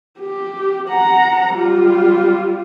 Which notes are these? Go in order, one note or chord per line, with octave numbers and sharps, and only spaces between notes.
G4
F#5 A#5
G3 F4